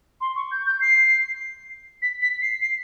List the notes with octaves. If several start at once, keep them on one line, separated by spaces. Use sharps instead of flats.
C6
C#6
G6
G6
C7
B6
B6
C7
C7